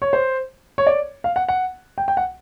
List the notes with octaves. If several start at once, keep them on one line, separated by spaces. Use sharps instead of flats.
C#5
C5
C#5
D5
F5
F#5
F#5
G5
G5
F#5